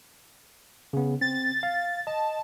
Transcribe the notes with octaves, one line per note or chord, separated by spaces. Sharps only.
C#3 B3
C4 A6
F5
D#5 A5